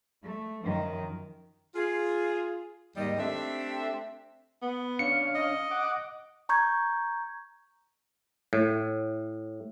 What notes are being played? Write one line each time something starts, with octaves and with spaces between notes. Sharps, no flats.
A3
F#2 D#3 F3
F4 G#4
D#2 G#2 D#3 G3 D#5
A3 C4 D4 G4 A4 E5
B3
C#4 D4 F5 C#7
D#5
F#5 D6
A#5 C#6 G6 G#6
A2